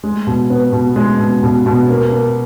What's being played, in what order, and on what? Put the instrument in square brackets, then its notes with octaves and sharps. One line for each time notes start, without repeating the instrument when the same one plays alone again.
[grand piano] G#3
B2
B3
B2
G#3
B2
B2
B2
A#3
A#3